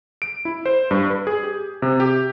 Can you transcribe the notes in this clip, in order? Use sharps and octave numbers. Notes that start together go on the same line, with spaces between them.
D7
E4
C5
G2
B4
G#4
G4
C3
G4